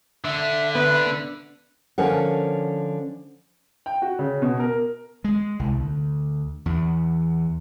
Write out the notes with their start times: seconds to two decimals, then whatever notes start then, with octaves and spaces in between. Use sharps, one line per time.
0.25 D3 E5
0.75 B3 B4
1.98 D3 F3 C#4 A#4 F#5
3.86 G5
4.02 F#4
4.19 C#3
4.42 B2
4.59 A#4
5.24 G#3
5.59 C2
5.80 D2
6.66 E2